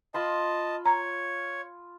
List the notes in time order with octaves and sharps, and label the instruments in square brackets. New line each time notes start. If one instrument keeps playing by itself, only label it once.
[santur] F4 B5 C6 [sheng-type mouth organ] D#5 A5
[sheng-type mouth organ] C#5 [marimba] A#5